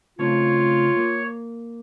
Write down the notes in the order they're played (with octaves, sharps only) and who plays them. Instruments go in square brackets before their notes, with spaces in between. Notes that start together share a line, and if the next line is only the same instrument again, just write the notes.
[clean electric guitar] C#3 A3 C4 [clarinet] F4 [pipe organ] C#5
[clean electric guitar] A#3